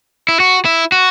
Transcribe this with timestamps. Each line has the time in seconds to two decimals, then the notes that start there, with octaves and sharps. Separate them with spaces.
0.28 E4
0.40 F#4
0.65 E4
0.92 F#4